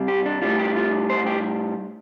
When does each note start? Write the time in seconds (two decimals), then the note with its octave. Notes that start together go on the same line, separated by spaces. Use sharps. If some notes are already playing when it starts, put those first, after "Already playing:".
Already playing: C3 G3
0.08 G4
0.26 D4
0.42 A2 G3 F4
0.59 G4
0.76 F4
1.09 C5
1.26 G4